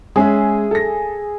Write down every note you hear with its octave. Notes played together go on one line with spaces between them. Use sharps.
G#3 C#4 G#4 E5
A4 A#6